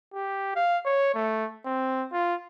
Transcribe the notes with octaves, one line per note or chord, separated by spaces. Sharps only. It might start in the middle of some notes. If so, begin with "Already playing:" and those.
G4
F5
C#5
A3
C4
F4